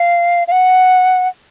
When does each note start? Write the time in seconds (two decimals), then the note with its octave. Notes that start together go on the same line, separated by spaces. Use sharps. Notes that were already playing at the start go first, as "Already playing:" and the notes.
Already playing: F5
0.48 F5
0.52 F#5